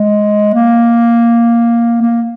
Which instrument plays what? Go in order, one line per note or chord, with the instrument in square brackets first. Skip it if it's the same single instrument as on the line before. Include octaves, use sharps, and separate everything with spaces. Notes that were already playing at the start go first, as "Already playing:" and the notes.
Already playing: [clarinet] G#3
A#3
A#3